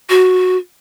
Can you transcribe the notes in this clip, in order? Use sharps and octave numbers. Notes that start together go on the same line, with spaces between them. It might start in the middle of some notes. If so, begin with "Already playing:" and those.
F#4